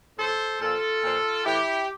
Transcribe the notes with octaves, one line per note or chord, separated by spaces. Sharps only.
A2 F3 A4 C5
A#2 F3 F4 A4
A#2 F3
A2 E3 E4 G4